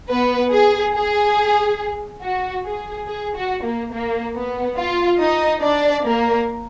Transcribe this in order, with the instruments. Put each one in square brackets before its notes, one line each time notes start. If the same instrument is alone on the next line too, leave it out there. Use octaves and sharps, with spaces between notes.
[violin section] B3 B4
G#4
G#4
F#4
G#4
G#4
F#4
A#3
A#3
B3
F4
D#4 D#5
D4 D5
A#3 A#4